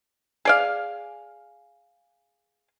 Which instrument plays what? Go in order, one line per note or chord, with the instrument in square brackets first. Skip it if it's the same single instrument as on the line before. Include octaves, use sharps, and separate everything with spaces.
[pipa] G#4 D5 F5